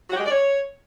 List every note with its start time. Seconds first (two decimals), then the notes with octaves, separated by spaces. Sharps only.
0.09 F#4
0.14 G4
0.19 G#3
0.24 D5
0.29 C#5